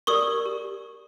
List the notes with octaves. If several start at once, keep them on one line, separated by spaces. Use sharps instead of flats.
G4 A#4 D5 C#6 D#6
G4